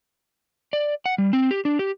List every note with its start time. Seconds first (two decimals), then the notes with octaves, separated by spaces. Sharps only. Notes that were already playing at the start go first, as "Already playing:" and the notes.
0.73 D5
1.06 F#5
1.18 G3
1.33 C4
1.51 G4
1.65 D4
1.79 G4